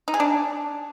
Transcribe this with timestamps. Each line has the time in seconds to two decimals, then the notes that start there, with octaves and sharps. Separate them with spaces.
0.08 D#4
0.14 G#4
0.20 D4